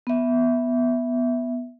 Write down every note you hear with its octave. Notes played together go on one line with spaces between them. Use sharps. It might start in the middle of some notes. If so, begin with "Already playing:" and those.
B3 E5